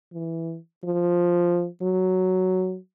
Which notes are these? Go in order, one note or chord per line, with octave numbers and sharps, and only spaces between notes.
E3
F3
F#3